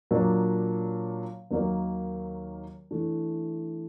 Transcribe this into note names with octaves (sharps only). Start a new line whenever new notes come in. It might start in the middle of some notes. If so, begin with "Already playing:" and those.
A#2 F#3 A#3 D4
D#2 D#3 F#3 A#3
E3 A3 D4